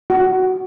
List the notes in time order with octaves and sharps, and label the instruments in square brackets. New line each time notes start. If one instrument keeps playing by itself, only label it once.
[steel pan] F#4